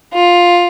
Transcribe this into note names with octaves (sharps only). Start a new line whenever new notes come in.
F4